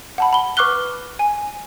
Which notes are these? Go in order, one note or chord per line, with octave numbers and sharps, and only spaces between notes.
F#5 A5 B5
B5 G7
B4 C#6 D6 F6 F#6 G7
G#5